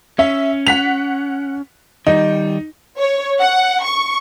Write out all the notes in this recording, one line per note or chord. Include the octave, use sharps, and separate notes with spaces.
C#4 E5
F#5 B6 F7
D#3 G3 D#4
C#5
F#5
C#6